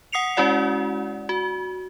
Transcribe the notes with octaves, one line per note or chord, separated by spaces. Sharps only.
F#5 D#6 C7 C#7 F7
G#3 C#4 E4 F#4 D5 F#5
F#4